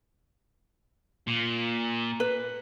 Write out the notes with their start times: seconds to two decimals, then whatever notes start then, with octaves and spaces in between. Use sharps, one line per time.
1.27 A#2
2.20 B4